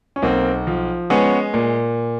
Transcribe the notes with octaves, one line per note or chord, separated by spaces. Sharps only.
C#4
B1 A#3 C4
F3
G#3 B3 C#4
A#2